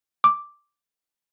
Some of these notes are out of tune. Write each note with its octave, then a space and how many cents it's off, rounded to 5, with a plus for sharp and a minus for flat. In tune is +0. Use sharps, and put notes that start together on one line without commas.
D6 +0